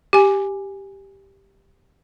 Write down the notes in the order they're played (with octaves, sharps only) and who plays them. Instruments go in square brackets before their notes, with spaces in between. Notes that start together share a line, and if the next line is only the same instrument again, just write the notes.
[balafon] G4 G#5